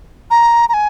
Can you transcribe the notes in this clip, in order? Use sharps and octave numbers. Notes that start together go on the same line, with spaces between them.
A#5
A#5
G#5